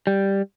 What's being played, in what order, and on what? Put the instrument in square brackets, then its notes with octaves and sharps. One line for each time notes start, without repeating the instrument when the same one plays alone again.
[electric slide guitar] G3